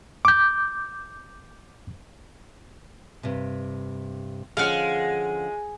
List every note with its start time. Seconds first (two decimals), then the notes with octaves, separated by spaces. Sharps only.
0.25 D6 G6
3.23 G2 C3
4.57 D3 F3 G#3 C#4 F5 F#5